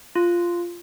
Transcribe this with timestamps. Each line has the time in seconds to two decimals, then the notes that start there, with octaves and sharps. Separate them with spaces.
0.16 F4